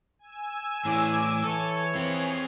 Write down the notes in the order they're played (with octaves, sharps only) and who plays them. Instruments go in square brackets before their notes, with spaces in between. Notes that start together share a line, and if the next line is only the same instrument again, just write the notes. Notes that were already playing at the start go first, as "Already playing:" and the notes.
[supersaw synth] G#5 E6
[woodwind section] E2 C#5 D6 [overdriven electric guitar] A2 E3
[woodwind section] E3 C#5 [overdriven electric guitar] A4
[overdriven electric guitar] C4 F4 [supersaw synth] G#4